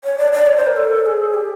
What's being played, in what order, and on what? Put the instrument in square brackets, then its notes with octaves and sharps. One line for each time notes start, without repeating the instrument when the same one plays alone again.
[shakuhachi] C#5
D5
D5
C#5
C5
A#4
A4
G#4
G4